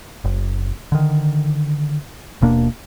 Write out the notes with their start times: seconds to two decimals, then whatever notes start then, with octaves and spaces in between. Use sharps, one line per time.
0.24 F#1
0.92 D3 D#3
2.41 D#1 B2 A#3 D4